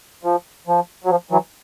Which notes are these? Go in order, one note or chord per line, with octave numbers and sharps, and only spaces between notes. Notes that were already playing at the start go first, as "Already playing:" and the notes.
F3
F3
F#3
F3
E3 F#3